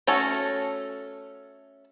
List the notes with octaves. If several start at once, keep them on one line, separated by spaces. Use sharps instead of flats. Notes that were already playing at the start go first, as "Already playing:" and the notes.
A3 C#4 F#4 A4